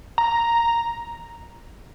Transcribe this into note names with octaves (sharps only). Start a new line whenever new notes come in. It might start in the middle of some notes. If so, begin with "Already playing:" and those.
A#5